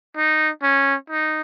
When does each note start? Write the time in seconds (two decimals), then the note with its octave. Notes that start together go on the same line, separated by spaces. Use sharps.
0.17 D#4
0.63 C#4
1.10 D#4